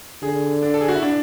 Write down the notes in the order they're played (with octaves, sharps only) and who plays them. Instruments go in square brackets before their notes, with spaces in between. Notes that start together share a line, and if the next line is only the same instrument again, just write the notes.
[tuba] D3 [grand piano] G#4
[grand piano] D4
A4
G#4
F#4
E4
D4